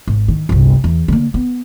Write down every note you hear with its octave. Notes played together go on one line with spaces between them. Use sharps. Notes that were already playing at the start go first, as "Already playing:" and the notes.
G#1
D#3
G1 C2
E2
D3 A#3
B3